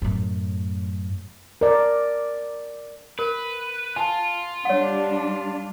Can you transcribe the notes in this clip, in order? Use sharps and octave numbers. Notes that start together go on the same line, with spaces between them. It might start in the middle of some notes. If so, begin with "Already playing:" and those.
F#2 A2
A#4 D5
A#4 B4
F4 G#5 A5
G3 D4 C#5 F#5